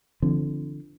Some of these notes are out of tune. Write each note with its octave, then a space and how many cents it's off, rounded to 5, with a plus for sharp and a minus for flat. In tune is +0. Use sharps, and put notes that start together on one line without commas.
D3 +0 F3 -35 C4 -15